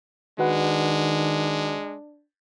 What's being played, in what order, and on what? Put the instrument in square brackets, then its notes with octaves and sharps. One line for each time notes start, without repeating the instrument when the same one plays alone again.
[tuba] D#3 [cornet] G#3 [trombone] D4 [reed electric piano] F#4 B4 F#5